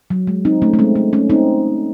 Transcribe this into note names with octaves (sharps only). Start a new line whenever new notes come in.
F#3
G#3
C4 D#4
A3 C#4
A3
G#3 C4
A3
A3 C#4
C4 D#4